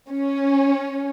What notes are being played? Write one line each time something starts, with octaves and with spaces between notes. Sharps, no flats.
C#4